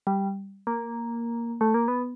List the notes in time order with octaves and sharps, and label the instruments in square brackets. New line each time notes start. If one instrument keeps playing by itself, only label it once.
[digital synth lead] G3
A#3
A3
A#3
B3